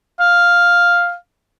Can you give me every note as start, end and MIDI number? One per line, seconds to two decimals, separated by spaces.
0.20 1.15 77